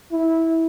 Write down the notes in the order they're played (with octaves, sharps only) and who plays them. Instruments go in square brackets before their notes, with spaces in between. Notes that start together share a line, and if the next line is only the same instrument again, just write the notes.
[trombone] E4